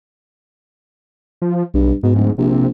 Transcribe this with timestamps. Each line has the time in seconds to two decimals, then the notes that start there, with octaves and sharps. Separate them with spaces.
1.42 F3
1.74 B1 G2
2.03 G#2 B2
2.15 D1
2.38 A#1 C3